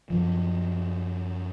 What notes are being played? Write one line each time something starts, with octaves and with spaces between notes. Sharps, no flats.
F#2 F3